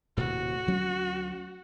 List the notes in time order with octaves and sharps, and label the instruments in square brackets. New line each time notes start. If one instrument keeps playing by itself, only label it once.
[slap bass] D#1 A2 C3 [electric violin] F#4
[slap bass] D2 F#3 C#4